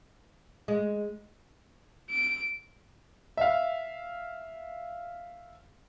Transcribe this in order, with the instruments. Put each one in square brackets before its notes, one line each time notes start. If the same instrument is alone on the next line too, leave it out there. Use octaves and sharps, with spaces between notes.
[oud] G#3
[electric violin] D7
[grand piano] E5 F5